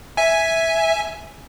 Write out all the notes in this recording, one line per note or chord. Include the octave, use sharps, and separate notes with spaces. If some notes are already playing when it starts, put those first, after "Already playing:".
E5 G#5